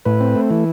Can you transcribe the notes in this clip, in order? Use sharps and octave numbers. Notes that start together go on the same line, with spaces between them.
A2 B4
C4
A3
E3